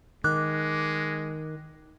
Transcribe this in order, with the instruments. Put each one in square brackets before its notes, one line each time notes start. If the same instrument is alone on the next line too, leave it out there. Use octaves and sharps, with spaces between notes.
[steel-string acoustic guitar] D#3 [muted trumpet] G#3 [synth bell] D6 F#6